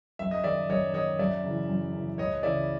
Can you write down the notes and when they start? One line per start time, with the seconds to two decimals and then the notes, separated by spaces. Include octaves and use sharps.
0.19 F#2 E5
0.31 D#5
0.43 D#3 D5 E5
0.70 F#2 C#5 D#5
0.94 D#3 C#5 D#5
1.19 F#2 D5 E5
1.44 C#3 E3
1.68 F#2
1.93 C#3 E3
2.18 C#2 C#5 D#5
2.43 C#3 E3 D5 E5